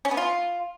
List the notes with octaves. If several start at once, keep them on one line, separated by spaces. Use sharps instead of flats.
C#4
B3
F4